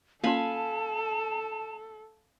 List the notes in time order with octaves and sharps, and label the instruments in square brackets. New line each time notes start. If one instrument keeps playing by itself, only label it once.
[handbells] A#3 C#4 F4 [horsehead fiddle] A4 [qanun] F5 G#5 B5 [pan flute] A5